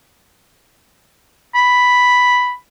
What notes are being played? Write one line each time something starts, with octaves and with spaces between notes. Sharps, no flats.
B5